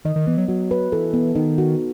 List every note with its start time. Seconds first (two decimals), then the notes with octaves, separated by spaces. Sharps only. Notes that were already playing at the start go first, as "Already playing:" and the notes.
0.05 D#3 D#5
0.16 D#3
0.27 E3 B3
0.38 F#3
0.48 F#3 F#4
0.71 B4
0.92 E3 A4
1.14 B3
1.35 D#3 D#4
1.58 F#4